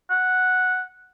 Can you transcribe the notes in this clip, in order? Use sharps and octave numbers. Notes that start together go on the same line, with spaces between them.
F#5